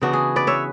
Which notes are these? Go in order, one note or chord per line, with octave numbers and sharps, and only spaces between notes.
C#3 E3 B3 D4 F#4
G#4
B4 D5
C#5 E5